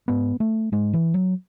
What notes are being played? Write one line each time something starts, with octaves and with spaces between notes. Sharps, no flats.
G#2 B3
A3
G#2 G#3
E3
F#3